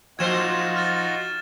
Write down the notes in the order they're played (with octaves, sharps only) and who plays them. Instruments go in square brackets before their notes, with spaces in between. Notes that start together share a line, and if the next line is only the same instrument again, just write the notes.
[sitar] A#2 F3 C5 [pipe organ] D#4 F4 F#4 [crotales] G#6 E7
[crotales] F6 A6